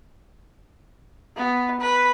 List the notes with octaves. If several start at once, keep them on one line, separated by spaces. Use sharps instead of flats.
B3
B4